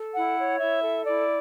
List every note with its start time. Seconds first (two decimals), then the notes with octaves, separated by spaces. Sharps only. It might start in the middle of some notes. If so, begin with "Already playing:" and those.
Already playing: A4
0.15 E4 F#5
0.38 C#5
0.60 E4 E5
0.82 A4
1.04 E4 D5